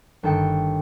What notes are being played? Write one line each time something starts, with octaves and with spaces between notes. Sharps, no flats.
G1 D#3 A4 G5 C#7